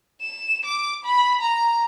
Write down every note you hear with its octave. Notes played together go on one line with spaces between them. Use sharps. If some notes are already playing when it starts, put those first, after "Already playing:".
E7
D6
B5
A#5